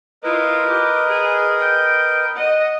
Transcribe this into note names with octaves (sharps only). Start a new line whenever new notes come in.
E4 F4 A#4 B4 D#5
G4
G#4
G5
D#5 F#5